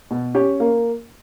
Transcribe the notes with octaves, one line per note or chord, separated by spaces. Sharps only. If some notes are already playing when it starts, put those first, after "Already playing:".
B2
C#4 G4
A#3